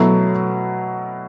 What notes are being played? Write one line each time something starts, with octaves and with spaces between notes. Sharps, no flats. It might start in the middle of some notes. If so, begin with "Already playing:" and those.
Already playing: B2 F#3 A3 E4